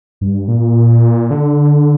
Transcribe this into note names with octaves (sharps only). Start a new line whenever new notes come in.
G2
A#2
D3